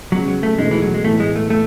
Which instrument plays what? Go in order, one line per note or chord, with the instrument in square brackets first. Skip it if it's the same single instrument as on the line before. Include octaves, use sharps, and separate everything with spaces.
[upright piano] C#3 G#3 B3 F#4 [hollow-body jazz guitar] F#3
[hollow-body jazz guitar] F#3
A3
[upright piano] E2 B2 A3 D#4 F#4 [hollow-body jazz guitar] G#3
[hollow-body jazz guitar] E3
F#3
G#3
[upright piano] A2 E3 B3 [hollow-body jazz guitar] A3
[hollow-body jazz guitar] G#3
A3
A3